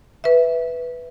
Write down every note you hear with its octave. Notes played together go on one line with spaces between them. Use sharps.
B4 E5